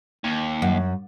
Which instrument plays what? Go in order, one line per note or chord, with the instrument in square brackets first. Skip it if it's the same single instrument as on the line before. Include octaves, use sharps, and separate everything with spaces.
[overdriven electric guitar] D#2
[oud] F#2